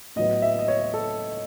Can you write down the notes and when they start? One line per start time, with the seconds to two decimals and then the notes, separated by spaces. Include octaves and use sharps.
0.16 A2 F#3 B3 D#5
0.42 E5
0.59 D#5
0.68 C#5
0.94 A4